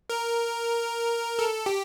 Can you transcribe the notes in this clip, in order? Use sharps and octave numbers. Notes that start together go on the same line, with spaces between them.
A#4
A4
G4